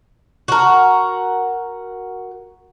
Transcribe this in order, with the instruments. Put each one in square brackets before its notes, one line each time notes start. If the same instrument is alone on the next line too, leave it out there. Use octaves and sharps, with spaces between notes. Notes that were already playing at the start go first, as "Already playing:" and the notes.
[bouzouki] F#4 A#4